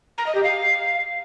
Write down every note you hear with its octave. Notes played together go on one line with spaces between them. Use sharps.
A#5
D#5
G4
F5